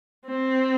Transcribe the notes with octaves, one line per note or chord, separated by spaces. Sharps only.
C4